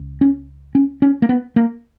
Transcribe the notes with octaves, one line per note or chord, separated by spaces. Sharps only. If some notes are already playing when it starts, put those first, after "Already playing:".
Already playing: C#2
C#4
C#4
C#4
A#3
B3
A#3